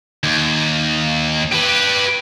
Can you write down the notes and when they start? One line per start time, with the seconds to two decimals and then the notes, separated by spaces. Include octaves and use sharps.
0.24 D#2
1.52 G4 B4